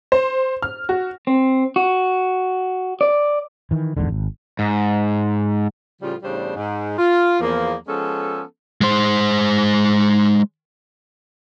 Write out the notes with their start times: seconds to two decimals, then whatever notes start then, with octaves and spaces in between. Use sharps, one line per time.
0.12 C5
0.62 F6
0.89 F#4
1.27 C4
1.76 F#4
3.01 D5
3.71 D#3 E3
3.97 A1 E2 G#2 D3
4.09 G#1
4.59 G#2
6.02 A2 C#3 F3 G3 F4
6.23 E2 A2 C#3 G3 D4 C5
6.56 G#2
6.98 F4
7.40 E2 F3 A#3
7.87 F3 G#3 B3 C#4 A4
8.81 G#3 C5